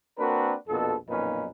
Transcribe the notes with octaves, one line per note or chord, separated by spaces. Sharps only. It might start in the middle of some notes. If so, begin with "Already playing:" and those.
A#3 C4 D4 F#4 A#4 B4
A#1 F2 B2 A4
B1 F2 A#2 C#4 D#4 B4